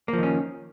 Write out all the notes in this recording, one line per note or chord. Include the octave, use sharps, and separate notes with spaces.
D#3 F3 A#3 C#4